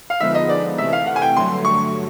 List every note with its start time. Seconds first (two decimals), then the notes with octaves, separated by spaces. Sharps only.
0.10 F5
0.20 D3 F3 G#3 B3 D#4 E5
0.35 D#5
0.49 D5
0.78 C3 E3 A3 E5
0.93 F5
1.06 F#5
1.16 G#5
1.22 G5
1.36 G2 D3 F#3 A3 C6
1.65 C#6